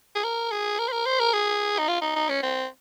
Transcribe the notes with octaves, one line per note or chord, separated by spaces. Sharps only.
G#4
A#4
G#4
A#4
C5
A#4
C5
A#4
G#4
D#4
F4
D#4
D#4
C#4
C4